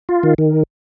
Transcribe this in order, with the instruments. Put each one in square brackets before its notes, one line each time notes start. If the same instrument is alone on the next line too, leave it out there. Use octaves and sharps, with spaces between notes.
[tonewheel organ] F4
D#3
D#3